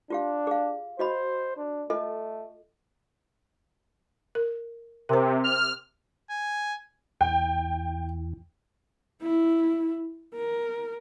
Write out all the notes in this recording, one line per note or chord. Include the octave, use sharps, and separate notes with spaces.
D4 F4 G4 F5
G#4 F5
F#4 C5 D#5 B5
D4
A3 F4 A4 D#5
A#4
C3 A#4 C5
F6
G#5
E2 G5
E4
A#4